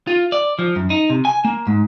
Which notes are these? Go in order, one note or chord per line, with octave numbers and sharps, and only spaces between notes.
F4
D5
F3
F#2
D#4
C3
G#5
A#3
G#2